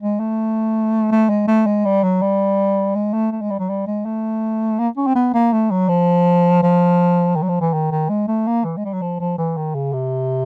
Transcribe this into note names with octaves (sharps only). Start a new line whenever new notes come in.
G#3
A3
A3
G#3
A3
G#3
G3
F#3
G3
G#3
A3
A3
G#3
G3
F#3
G3
G#3
A3
A#3
C#4
C4
B3
A#3
A3
F#3
F3
F3
D#3
F#3
F3
E3
D#3
D#3
G#3
A3
A#3
E3
G#3
G3
F#3
F3
F3
E3
D#3
C#3
C3